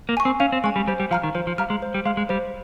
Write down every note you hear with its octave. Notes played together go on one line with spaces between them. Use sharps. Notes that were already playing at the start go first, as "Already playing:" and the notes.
A#3
G#5 C#6
C4
C#4 F5
C4
G#3 G#5 C#6
G3
G3 C5
G3
F3 F5 A#5 F6
D#3
F3 C5
F3
G3 F5 A#5 F6
G#3
C5
G3
G#3 F5 A#5 F6
G#3
G3 C5